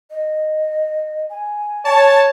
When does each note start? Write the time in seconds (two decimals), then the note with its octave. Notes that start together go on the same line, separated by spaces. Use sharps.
0.11 D#5
1.30 G#5
1.85 C#5 A5